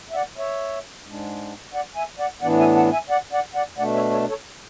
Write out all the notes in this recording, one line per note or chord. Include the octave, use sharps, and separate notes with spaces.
E5
D5 F#5
C#5 E5
G#2 G#3 D4
D5 F#5
E5 G#5
D5 F#5
A2 E3 B3 D4 D5 F#5
E5 G#5
F#5 A5
E5 G#5
D5 F#5
D5 F#5
D5 F#5
B2 A3 D4 D5 F#5
C#5 E5
A4 C#5
A4 C#5